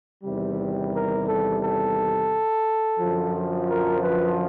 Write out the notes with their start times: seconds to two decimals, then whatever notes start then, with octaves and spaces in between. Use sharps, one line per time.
0.24 E2 C3 D#3 G3
0.93 A#4
1.28 A4
1.62 A4
3.00 F#2 D3 F3
3.68 A#4
4.03 B4